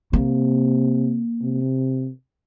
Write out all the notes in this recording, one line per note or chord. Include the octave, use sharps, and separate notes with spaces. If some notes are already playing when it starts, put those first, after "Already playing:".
C3 A#3
C3